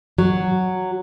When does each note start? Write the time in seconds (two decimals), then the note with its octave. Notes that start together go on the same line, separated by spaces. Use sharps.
0.18 F#3